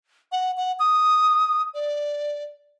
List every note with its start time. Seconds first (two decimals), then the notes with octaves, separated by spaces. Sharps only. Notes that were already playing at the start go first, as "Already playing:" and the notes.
0.32 F#5
0.57 F#5
0.79 D#6
1.74 D5